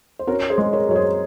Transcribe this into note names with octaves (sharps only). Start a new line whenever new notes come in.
C5
C#4 F#4 A#4
G#4 C5
G#3
A#4 C#5
F#2 C#5
G#4 C5